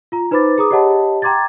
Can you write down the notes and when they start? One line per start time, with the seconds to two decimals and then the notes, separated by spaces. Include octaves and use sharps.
0.12 F4 A#5
0.31 D#4 B4 C5 B5 D6 A6
0.58 G#4 A#5 D6 D#6
0.71 G4 C#5 D#5 F#5 A5 B5
1.22 G5 A#5 C6 D6 G#6 A6